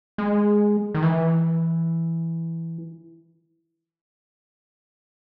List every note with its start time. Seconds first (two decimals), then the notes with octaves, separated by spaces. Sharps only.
0.18 G#3
0.94 D#3
1.03 E3